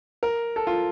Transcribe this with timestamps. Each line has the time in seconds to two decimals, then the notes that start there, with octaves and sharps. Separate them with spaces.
0.23 A#4
0.56 A4
0.67 F4